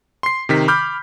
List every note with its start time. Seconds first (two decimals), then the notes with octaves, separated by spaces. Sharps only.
0.23 C6 C7
0.49 C3 D#3 B6
0.68 B5 D6 F6 G6